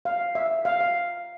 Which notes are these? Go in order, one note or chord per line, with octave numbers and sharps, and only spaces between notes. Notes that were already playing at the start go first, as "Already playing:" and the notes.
F5
E5
F5
F5